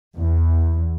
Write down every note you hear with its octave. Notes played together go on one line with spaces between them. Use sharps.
E2